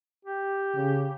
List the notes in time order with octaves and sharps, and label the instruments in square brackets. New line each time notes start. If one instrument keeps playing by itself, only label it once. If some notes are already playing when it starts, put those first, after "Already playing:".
[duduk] G4
[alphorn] C#3